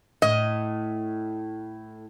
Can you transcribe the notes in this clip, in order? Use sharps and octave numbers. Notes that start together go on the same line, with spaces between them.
A2 D#5